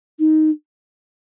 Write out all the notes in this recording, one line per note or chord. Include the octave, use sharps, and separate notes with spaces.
D#4